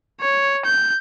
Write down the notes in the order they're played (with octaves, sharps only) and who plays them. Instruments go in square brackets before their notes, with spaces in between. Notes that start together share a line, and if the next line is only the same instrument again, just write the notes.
[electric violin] C#5
G6